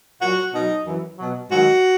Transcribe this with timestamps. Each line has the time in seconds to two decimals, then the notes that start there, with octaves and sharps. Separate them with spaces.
0.21 A#2 F#3 F#4
0.54 B2 F#3 D#4
0.86 F#2 E3
1.19 B2 F#3
1.51 G#2 D#3 F#3 F#4